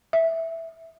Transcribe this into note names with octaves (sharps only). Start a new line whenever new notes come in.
E5